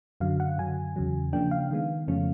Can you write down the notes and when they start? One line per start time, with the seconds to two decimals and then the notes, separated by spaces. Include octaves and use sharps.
0.20 F#2 D3 F#3 F5
0.40 F#5
0.58 F#2 D3 F#3 G#5
0.96 E2 C#3 F#3
1.33 C#3 F3 A#3 D4 G5
1.51 F5
1.71 D#3 G#3 B3
2.08 F2 C#3 F3 A3 C#4